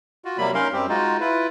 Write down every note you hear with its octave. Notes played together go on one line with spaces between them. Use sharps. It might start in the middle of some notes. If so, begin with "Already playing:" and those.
F4 F#4
C3 F#3 G3 A#3 B5
C#4 D#4 A#4 F5 C6
F#2 G3 C4 G4
G#3 D#4 F4 F#4
E4 F4 B4